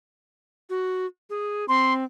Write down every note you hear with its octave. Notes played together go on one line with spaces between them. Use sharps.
F#4
G#4
C4 C6